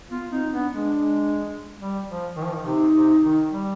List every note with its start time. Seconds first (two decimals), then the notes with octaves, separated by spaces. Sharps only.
0.10 B3 F4
0.31 C4 D#4
0.52 B3 D4
0.74 G#3 D4
0.95 G#3
1.80 G3
2.08 F3
2.36 D#3
2.45 F3
2.55 D#3
2.65 C3 D#4
2.93 C3
3.22 D#3
3.51 G3